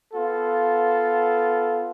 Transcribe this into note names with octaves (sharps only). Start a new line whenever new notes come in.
B3 F4 A4